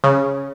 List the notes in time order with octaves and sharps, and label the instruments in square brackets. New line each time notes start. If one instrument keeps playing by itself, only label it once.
[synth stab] C#3